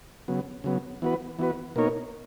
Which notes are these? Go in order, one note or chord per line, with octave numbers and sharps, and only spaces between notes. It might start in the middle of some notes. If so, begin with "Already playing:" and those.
C#3 F#3 B3
C#3 F#3 B3
E3 B3 F#4 B4
E3 B3 F#4 B4
B2 A#3 D#4 A#4 C#5